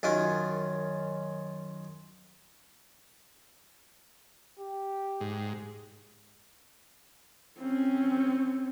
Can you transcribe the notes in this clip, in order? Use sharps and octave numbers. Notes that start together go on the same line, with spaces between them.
F#2 D#3 F4
G4
G#2
C4 C#4